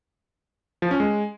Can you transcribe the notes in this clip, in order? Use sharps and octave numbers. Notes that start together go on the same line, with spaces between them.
F3
C#4
G#3